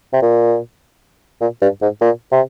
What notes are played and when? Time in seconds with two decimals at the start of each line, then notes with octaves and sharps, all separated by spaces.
0.13 C3
0.22 A#2
1.41 A#2
1.61 G2
1.82 G#2
2.01 A#2
2.32 C3